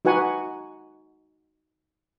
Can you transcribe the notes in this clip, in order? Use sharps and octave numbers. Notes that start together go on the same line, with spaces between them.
D#4 F#4 B4 F#5 G#5